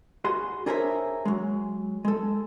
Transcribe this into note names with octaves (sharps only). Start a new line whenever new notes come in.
F#4 G#4 C6
D4 G#4 A#4 C5 C#5 E5
F#3 G#3
G#3 A4